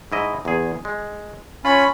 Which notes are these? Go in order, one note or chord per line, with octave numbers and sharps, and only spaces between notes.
G#2 E4 D#5
E2 G#4
G#3
C#4 F4 B5